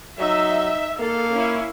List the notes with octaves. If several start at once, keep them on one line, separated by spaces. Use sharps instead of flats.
F#3 D#4 E5
A#3 A4 F5
C#4 E4